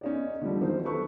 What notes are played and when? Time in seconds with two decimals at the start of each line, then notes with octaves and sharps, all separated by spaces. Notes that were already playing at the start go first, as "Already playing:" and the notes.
0.01 C#4 D#4 D5
0.41 D3 F3 G3
0.61 D#3 F#3 C5
0.85 A4 B4 C#6